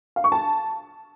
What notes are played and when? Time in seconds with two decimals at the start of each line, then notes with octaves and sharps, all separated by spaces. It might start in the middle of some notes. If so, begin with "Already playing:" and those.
0.16 F5
0.24 C#6
0.32 A5